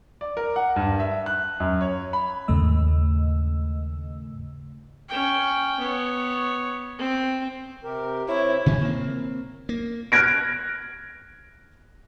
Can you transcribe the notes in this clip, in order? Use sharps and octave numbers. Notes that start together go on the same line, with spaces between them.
D5
A#4
F#5
G2
E5
F#6
F#2
C#5
B5
D#2 G#2 C#3 A3 D#5 E6
C#4 G5
B3 C#5
C4
C3 G4 A#4
C3 C4 E4 C#5
C3 D#3 F3 G#3
A#3 C4
A#3
F6 F#6 G#6 A#6 D7